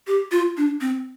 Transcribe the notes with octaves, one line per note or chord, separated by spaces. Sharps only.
G4
F4
D4
C4